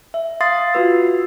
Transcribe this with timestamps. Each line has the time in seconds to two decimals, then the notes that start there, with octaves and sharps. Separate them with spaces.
0.14 E5
0.41 F5 C6 D#6 A6 C7
0.74 F4 F#4 B4 E6